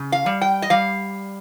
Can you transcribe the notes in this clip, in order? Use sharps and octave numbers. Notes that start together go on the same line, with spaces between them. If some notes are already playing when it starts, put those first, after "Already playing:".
Already playing: C#3
F5
G3
G5
D#5
G3 F5